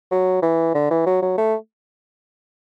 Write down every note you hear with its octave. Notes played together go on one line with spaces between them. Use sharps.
F#3
E3
D3
E3
F#3
F#3
A3